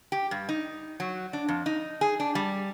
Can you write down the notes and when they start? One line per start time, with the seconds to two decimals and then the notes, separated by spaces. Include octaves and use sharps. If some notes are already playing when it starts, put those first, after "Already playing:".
0.12 G4
0.31 G2
0.49 D#4
1.00 F#3
1.33 D4
1.48 F2
1.66 D#4
2.01 G#4
2.20 D4
2.35 G3